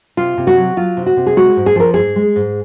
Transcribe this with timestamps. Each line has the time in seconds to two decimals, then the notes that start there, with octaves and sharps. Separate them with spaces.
0.17 C3 F4
0.38 C3
0.47 F#4
0.57 F#3
0.77 F#3 F4
0.97 C3
1.06 F#4
1.17 C3
1.27 G#4
1.36 G#3 F#4
1.56 G#2
1.66 G#4
1.76 F3 A#4
1.94 G#2 G#4
2.16 G#3
2.36 G#2